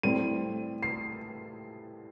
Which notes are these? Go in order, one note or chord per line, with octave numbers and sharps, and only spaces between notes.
A2 G3 C4 D#7
C7